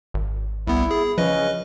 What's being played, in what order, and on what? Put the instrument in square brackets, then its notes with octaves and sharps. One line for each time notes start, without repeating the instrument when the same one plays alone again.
[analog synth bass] G#1
[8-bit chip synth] C2 B3 [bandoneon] E4
[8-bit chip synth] G#4
[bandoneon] C#3 C#4 [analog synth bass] F3 [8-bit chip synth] B4 D#5